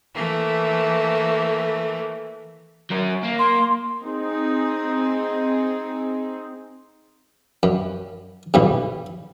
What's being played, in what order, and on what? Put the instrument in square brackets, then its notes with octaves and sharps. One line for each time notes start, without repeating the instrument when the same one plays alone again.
[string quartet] E3 A3 A#3
[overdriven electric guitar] F#3 A#4
A#3
[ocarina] C6
[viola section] C4 D#4 G#4
[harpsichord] F#2
B1 E2 G2